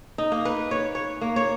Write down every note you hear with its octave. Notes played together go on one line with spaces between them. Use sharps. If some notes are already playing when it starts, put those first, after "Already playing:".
D#4
A#3
B4
C#5
C#5
A#3
C#5